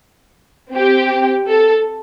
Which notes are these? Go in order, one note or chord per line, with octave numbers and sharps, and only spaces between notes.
C4
G4
A4